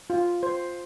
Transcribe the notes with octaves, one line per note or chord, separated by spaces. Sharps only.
F4
C5